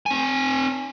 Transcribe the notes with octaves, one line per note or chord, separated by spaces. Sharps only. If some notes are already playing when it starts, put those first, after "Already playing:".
C4 G#5